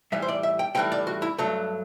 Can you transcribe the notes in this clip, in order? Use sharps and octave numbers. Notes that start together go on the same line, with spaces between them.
A2 E3 G3 E5
C5
D5
E5
G5
A2 E3 G3 G5
D5
F#4
E4
G2 F#3 A3 D4